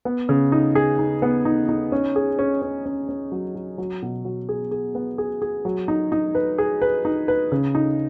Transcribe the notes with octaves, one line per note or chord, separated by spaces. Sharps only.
B3
C#3
D#4
G#4
D#4
B3
D#4
D#4
C#4
G#4
C#4
C#4
C#4
C#4
F#3
F#3
F#3
B2
F#3
G#4
G#4
B3
G#4
G#4
F#3
D#4
D#4
B4
G#4
B4
D#4
B4
C#3
D#4